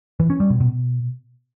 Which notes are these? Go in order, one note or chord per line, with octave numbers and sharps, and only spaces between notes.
E3
C#4
G3
B2
B2